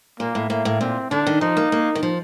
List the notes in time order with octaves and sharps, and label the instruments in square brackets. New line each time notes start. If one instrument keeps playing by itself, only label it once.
[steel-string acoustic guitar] A#2 [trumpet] A#3
[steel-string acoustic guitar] A2
[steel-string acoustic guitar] A2 [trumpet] A#3
[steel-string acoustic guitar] A2
[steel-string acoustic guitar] A#2 [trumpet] C4
[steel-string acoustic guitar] D3 [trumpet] D4
[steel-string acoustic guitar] D#3
[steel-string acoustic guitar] F3 [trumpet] D#4
[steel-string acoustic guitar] A#3
A#3
D#3
F3